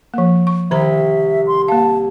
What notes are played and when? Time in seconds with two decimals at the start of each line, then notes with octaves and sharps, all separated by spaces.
0.14 F3 A#3
0.47 C#6
0.71 C2 D#3 C5 E5 A#5
1.47 C6
1.68 A#3 F5 A5